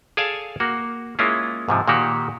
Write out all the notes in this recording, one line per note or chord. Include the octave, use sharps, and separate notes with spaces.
G#4 A4 D5 F5 G#5 A5
A#3 F#4
G#3 A#3 C#4 E4 F4
G#2 C3 F3
A#2 D#3 A#3 F#4 G4